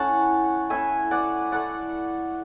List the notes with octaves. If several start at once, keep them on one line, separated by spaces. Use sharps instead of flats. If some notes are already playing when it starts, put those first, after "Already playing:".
Already playing: A3 C#4 E4 F#5 A5
A3 C#4 E4 E5 G#5
D5 F#5
A3 E4 D5 F#5